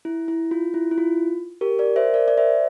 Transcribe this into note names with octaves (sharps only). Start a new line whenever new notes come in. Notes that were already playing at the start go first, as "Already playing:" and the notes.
E4
E4
F4
E4
E4
F4
G4 A#4
A#4 D5
C5 E5
A#4 D5
D5
C5 E5